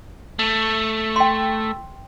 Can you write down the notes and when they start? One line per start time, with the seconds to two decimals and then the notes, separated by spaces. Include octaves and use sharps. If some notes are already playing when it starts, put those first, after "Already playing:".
0.39 A3
1.16 G5 C6